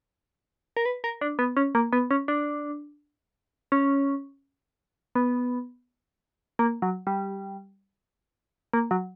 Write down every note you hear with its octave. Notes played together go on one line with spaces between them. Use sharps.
A#4
B4
A#4
D4
B3
C#4
A#3
B3
C#4
D4
C#4
B3
A#3
F#3
G3
A#3
F#3